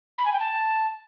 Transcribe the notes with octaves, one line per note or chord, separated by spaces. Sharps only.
B5
G#5
G5
A5